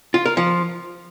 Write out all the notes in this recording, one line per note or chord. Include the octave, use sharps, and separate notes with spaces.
F4
A#4
F3